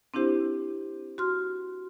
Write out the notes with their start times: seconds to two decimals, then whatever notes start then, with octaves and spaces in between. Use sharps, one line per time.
0.14 C4 D4 E4 G4 C5
1.18 F#4 C6 F6